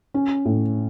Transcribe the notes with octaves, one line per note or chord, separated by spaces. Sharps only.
C#4
A2